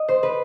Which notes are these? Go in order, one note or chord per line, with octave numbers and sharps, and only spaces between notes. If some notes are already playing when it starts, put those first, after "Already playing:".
Already playing: D#5
C5
B4